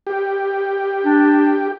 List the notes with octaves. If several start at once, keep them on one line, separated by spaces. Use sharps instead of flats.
G4
D4